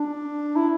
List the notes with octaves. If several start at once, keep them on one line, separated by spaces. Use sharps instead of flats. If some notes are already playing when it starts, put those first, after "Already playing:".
Already playing: D4
E4